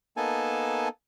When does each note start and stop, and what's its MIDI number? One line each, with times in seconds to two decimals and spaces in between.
0.17 0.88 58
0.17 0.88 59
0.17 0.88 63
0.17 0.88 69
0.17 0.88 80
0.17 0.88 81